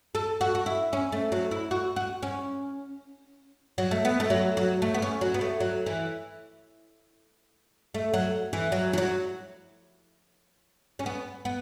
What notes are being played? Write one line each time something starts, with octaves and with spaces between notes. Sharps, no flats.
A4
F#4
F#4
E4
C#4
A3
F#3
E4
F#4
F#4
C#4
F#3
A3
B3
A3
F#3
F#3
A3
B3
C#4
F#3
B3
A3
F#3
E3
A3
F#3
E3
F#3
E3
F#3
C#4
B3
B3